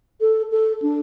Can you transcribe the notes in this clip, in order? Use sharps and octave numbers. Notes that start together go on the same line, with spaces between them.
A4
A4
D4